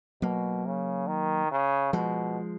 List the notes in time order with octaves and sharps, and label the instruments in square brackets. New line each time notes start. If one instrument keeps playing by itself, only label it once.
[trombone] B2 [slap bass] F#3 A#3
[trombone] C#3
D#3
C#3
[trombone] B2 [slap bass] F3 G#3